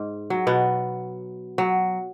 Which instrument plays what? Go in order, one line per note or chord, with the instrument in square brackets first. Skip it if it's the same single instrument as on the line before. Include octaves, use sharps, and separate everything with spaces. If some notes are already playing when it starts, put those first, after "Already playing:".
Already playing: [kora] G#2
F#3
B2 B3
F#3